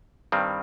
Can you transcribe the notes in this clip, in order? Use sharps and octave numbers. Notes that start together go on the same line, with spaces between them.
G2 D#3 G3 C4